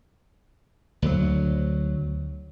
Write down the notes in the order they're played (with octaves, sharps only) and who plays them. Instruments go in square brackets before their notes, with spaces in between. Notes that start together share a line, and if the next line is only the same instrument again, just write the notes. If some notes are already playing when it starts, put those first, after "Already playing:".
[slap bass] D2 F#3